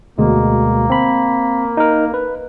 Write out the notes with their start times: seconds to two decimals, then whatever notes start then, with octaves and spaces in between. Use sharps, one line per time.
0.18 D2 B2 G#3 A#3
0.90 C4 B5
1.77 D#4 A#4
2.14 B4